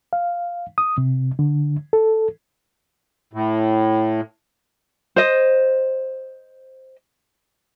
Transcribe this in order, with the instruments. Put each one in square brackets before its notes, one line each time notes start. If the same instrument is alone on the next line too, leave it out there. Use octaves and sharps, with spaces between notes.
[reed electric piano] F5
D#6
C3
D3
A4
[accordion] A2
[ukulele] C5 D#5